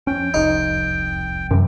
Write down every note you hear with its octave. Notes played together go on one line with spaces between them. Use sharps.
F2 C#4 G5
E1 C2 F2 D#4
F#2 C3 E3 F#3